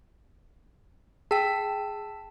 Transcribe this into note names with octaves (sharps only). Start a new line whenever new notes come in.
G#4 G5 A5 E6 B6